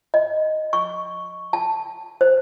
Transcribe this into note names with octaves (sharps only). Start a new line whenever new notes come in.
D#5
C#6
A5
C5